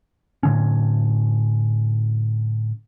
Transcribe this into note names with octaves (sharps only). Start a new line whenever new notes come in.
A2 D3 C#4